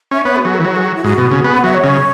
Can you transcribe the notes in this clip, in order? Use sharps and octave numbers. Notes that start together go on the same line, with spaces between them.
C#4 E5
B3 C#5
F#4
F#3 G#4
E3 B4
F#3 C#5
G#4
F#4
E4
G#2 F#4
B2
C#3
B3 G#4
F#5
F#3 E5
C#5
C#3